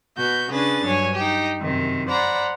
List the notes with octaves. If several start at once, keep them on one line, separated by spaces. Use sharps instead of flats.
B2 F#4 G6
C#3 C#4 D4 G#4 B4 A6
G2 F#3 C#5 G#5
D#4 G4
F#2 C3 D#3
C5 D5 F#5 A#5 B5